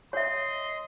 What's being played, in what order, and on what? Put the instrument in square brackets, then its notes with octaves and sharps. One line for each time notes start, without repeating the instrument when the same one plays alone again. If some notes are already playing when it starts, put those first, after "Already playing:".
[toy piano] C#5 E5 [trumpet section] D#5 C6